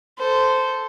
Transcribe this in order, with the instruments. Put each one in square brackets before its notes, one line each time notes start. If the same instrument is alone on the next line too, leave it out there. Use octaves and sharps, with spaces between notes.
[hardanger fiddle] A4 C5